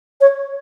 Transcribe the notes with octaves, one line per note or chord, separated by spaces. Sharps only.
C#5